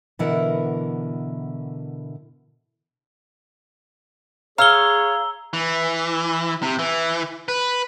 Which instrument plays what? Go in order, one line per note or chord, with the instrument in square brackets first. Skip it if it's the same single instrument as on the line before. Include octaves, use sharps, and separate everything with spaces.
[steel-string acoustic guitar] B2 D3 E3 E4 A#4 F#5
[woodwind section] G#4 C#5 [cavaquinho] F5 [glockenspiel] A#5 E6 G7
[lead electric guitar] E3
C3
E3
B4